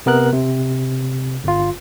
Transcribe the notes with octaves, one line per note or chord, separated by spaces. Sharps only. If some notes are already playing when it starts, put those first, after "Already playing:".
C3 B3 A#4 F#6
C3
G1 F4